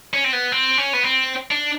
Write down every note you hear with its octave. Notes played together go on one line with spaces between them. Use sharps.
C#4
C4
B3
C4
C#4
B3
C4
D4